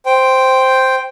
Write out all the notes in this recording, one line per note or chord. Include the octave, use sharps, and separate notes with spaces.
C5 G5